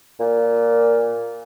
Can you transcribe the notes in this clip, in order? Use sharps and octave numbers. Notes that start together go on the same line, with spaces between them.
A#2